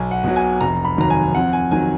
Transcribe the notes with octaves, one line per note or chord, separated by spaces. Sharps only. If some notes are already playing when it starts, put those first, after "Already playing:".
Already playing: B1 G#5
F#5
B2 F#3
G#5
F1 A#5
B5
D#2 D#3 F#3 A#5
G#5
F2 F#5
G#5
D#3 F#3 G#5